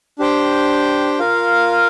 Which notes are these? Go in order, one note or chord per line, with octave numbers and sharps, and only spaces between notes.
D4 G4 C5 G5
F4 A#4 F5